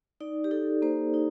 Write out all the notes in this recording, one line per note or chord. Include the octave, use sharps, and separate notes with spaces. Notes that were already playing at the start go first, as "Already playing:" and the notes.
D#4 D5
G4
D#4 A4
A#3 C5
D#4